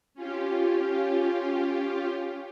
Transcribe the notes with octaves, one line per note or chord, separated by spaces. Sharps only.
C#4 F4 G4